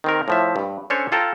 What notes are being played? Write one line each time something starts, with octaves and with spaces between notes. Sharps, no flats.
D#3 C4 A#4
A2 F3 E5
G2
C#4 D4 A4 C5 C#5
F4 A4 G5 A#5